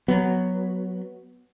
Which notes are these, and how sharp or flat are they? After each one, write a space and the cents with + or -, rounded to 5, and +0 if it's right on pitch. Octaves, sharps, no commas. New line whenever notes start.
F#3 +0 B3 +0